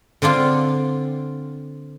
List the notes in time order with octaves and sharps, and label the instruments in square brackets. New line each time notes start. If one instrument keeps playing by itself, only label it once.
[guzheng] D3 C4 D4 F4